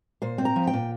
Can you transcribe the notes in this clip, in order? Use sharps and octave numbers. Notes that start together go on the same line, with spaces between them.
A#2 C5
C4
A#5
F3
G5
A#2